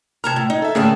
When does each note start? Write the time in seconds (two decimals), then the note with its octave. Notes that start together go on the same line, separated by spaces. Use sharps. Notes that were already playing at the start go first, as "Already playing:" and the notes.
0.24 C3 A5 A#5 F6 G#6
0.36 A2
0.50 D#4
0.62 A4 E5
0.75 D2 A2 C#3 A#3 G#4 A5